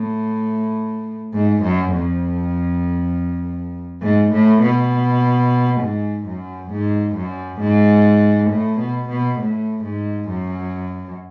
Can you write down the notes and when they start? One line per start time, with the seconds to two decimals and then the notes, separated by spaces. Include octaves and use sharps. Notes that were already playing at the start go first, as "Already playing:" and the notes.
Already playing: A2
1.34 G#2
1.63 F#2
1.94 F2
4.02 G#2
4.32 A2
4.62 B2
5.81 G#2
6.26 F#2
6.71 G#2
7.16 F#2
7.60 G#2
8.50 A2
8.80 B2
9.09 B2
9.39 A2
9.84 G#2
10.29 F#2